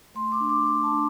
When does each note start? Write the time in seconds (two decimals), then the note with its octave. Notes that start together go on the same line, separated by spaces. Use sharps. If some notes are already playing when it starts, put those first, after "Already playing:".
0.15 A3 C6
0.32 D6
0.40 D4
0.49 D6
0.66 A3 D6
0.83 A5
0.92 D4